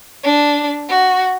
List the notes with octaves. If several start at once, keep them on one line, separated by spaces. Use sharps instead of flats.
D4
F#4